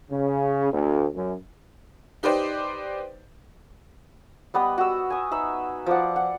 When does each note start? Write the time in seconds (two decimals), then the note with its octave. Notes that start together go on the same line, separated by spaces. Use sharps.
0.10 C#3
0.72 D2
1.14 F#2
2.23 D#4 G4 B4 C5 D5
4.54 G3 B3 B4 D#5
4.78 F#4 E6
5.10 G#5 D#6
5.31 D#4 B4 E5 B5
5.86 F3 D5 F#5
6.16 F#5